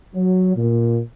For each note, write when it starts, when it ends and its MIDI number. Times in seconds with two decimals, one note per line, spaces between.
0.15 0.55 54
0.56 0.99 46